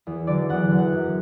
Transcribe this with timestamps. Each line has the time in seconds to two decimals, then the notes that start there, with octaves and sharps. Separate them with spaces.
0.07 E2
0.27 D3 F#3 D5
0.49 E2 F#5
0.71 D3 F#3
0.78 F#5
0.92 F#2